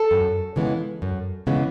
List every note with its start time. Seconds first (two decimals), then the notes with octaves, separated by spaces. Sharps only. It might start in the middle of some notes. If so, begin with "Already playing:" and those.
Already playing: A4
0.11 F#2
0.56 C#3 E3 G#3 B3
1.02 F#2
1.47 C#3 E3 G#3 B3